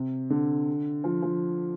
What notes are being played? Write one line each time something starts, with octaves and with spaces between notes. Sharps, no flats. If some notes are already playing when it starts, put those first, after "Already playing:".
Already playing: C3
D3
F3
F3